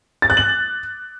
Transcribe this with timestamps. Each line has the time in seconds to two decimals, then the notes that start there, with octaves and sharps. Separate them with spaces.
0.22 A6
0.30 F#6
0.37 F#7